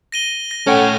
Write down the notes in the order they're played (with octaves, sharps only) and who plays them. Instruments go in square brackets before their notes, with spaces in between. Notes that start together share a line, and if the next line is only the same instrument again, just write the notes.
[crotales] A#6 D#7 G7
A#6
[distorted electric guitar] A3 C#5 [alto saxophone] C#4 [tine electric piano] A4 F#5 G5